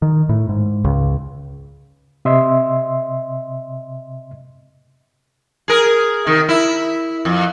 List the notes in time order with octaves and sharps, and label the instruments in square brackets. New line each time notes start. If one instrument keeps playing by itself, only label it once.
[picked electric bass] D#3
A2
G#2
C#2
[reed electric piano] C3 D#5 E5 C6
[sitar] G#4 A#4
C3 D#3
E4
F2